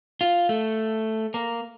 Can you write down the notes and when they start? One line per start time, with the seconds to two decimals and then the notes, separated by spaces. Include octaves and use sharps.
0.21 F4
0.49 A3
1.34 A#3